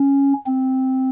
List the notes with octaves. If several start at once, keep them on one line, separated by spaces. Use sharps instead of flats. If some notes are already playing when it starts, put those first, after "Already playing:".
Already playing: C#4
C4